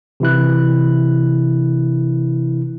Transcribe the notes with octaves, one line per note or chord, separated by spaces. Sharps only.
C3 E3 E4 F#6